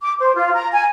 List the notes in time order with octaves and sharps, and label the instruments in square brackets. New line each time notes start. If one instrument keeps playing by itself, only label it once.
[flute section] D6
C5
F4
A#5
G#5